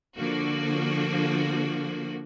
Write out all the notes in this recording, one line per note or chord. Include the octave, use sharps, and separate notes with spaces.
D3 F3 A#3 F#4